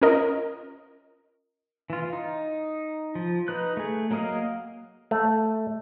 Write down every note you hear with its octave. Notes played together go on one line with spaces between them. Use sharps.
C#4 F4 A#4 D#5
E3 F4
D#4
F3
D#4 B4 F#6
A3 G#4
F#3 A#3 A#4 D#5 F5
A3